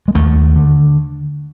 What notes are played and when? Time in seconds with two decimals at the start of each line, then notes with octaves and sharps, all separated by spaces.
0.08 G#3
0.15 D#2 A3
0.56 D3